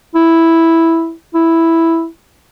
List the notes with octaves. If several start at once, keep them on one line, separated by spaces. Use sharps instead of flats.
E4
E4